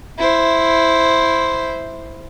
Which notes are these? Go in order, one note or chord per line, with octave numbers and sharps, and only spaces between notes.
E4 C5